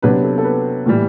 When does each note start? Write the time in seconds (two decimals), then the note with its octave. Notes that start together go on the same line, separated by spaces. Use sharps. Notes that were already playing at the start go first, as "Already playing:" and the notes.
0.02 C3 F#3 B3 D4 B4
0.23 A4
0.38 A4
0.44 B4
0.86 A2 E3 G3